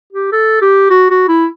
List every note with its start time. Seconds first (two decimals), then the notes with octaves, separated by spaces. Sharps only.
0.12 G4
0.32 A4
0.62 G4
0.90 F#4
1.10 F#4
1.28 E4